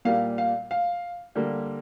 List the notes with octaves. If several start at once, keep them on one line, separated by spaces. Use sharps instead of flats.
A#2 G3 A#3 F5
F5
F5
D3 G3 A#3